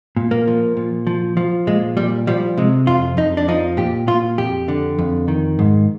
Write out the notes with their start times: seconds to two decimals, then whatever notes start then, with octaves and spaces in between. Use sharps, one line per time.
0.17 A#2
0.31 A#3
0.47 F3
0.77 A#2
1.07 F3
1.37 F3
1.67 A#2 G#3
1.97 A#2 G3
2.27 F3 G3
2.57 C3 G#3
2.87 F2 F4
3.17 F2 D#4
3.37 D4
3.48 F3 D#4
3.77 A#2 G4
4.07 A#2 F4
4.38 F2 G4
4.68 D3
4.99 F2
5.28 D#3
5.59 G#2